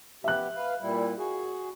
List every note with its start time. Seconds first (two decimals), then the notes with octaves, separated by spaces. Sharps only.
0.24 B3 G4 E5 F#6
0.56 B4 F5
0.81 A#2 G3 E4
1.18 F#4 G#4